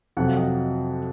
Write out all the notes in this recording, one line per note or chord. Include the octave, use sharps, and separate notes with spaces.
F2 C3 F#3 F#5
F5
D#5 F#5